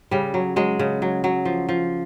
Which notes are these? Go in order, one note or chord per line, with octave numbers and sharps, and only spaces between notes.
C#3 G3
F#3
F#3 G#3
C#3
F#3
F#3
F3
F3